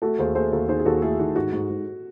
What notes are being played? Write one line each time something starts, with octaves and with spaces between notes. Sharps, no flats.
A3 F#4 A4
D#2 G#4 C5
A3 G#4 C5
D#2 F#4 A4
D#3 G#4 C5
G#4
D#2 F#4 A4
A3 E4 G#4
D#3 F#4
G#2 F#4
G#2
G#2